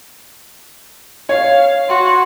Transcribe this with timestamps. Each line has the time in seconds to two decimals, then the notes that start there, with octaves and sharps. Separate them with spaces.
1.29 C#5 F5
1.89 F#4 C6